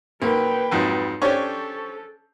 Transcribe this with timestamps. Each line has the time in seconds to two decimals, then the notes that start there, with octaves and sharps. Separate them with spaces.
0.22 B1 A#3 B4 G5
0.72 F2 G#2 F#3
1.22 C#4 D4 G4 A4 C5 C#5 C#6